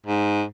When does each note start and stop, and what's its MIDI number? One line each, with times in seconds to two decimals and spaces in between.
0.06 0.44 44